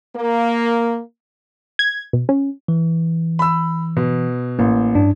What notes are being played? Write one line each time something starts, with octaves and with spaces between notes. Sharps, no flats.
A#3
G#6
B2
C#4
E3
B5 E6
B2
A1 A#3
G2 D4